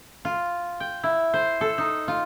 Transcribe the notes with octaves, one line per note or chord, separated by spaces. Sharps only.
F4
G5
E4
C5
A4
D#4
F4